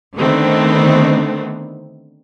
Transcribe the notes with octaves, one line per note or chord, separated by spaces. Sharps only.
D3 D#3 A3 B3 C4